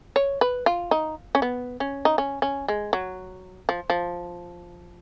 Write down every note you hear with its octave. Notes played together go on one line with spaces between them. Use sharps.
C#5
B4
F4
D#4
C#4
B3
C#4
D#4
C#4
C#4
G#3
F#3
F3
F3